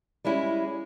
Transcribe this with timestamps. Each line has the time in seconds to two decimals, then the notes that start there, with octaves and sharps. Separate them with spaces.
0.25 G3 G#3 C#4 E4